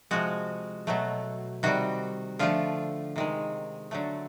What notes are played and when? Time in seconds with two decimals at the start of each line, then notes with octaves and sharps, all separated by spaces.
0.11 C3 F3 G#3 F#4
0.87 B2 F#3 A3
1.63 C3 D#3 G3 F#4
2.39 D3 F3 A3 F4
3.16 C3 D#3 G#3
3.91 D3 F#3 A3